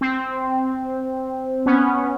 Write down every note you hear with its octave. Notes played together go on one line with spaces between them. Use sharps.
C4
B3 C#4